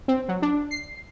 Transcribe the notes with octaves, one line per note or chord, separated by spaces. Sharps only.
C4
F#3
D4
C7